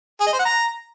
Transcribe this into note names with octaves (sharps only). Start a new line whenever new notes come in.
G#4
D#5
C5
F#5
A#5